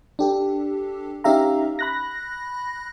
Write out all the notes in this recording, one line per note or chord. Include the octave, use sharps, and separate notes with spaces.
D4 G4 A4
C#4 D#4 G4 E5 F5 A#5
B5 F#6 A#6